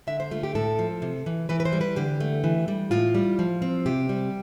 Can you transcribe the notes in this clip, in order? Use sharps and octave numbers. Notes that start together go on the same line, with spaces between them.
D3 E5
C5
A3 F4
G4
A2 A4
F3
C3
E3
E3 B4
B4
C5
G3
B4
D3 G4
A3
E3
G3
A2 F4
G3
F3
C4
C3 G4
G3